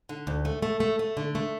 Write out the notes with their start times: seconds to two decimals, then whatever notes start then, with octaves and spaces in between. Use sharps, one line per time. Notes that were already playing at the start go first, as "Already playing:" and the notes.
0.09 D3
0.27 D2
0.45 A3
0.62 A3
0.80 A3
0.99 A3
1.17 D3
1.35 A3